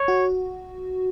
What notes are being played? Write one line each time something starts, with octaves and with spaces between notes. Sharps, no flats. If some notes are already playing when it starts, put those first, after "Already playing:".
Already playing: C#5
F#4